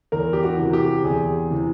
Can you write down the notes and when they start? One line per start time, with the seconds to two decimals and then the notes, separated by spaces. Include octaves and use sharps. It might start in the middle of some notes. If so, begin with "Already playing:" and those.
0.12 E2 A#4
0.33 G4
0.43 F#4
0.58 C3 E3
0.73 G4
1.04 E2 G#4
1.50 C3 E3